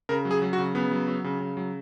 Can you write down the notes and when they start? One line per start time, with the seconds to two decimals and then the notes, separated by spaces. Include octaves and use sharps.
0.09 C#3 A#4
0.25 F#3
0.31 G#4
0.42 F#3
0.53 F#4
0.58 C#3
0.75 C#3 B3
0.91 F#3
1.08 F#3
1.24 C#3
1.40 C#3
1.57 F#3